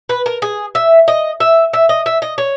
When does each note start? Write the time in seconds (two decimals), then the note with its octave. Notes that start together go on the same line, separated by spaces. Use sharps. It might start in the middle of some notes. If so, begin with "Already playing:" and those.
0.09 B4
0.26 A#4
0.42 G#4
0.75 E5
1.08 D#5
1.40 E5
1.73 E5
1.89 D#5
2.06 E5
2.22 D#5
2.38 C#5